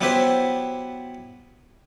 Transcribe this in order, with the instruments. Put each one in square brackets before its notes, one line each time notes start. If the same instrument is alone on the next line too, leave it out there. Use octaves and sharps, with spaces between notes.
[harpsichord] F#3 B3 E4 G4 B4 C5